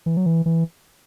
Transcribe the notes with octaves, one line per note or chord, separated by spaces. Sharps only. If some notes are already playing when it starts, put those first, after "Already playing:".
E3
F#3
E3
E3